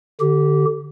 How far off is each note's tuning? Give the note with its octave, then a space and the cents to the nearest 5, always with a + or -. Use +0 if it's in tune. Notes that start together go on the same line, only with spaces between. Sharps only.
D3 +10 G4 -20